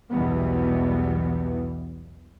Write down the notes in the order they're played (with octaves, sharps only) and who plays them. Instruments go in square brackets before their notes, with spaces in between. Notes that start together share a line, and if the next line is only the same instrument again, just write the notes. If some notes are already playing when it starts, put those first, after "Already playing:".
[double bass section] B1 E2 B2 E3 G3 B3